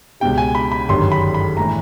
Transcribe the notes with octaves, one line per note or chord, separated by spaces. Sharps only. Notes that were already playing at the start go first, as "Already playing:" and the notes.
C#2 B2 G3 G5
G#5
B5
B5
G1 F#2 D#3 G3 C6
B5
B5
A2 E3 A#5